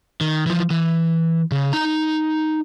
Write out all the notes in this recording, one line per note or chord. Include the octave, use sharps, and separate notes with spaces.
D#3
E3 F3
E3
C#3
D#4 A#5